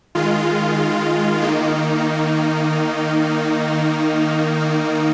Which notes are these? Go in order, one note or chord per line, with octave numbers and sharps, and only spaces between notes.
D#3 G#3 F4
D#3 A#3 D#4